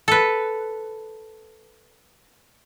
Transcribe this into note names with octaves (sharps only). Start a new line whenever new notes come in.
A4 B4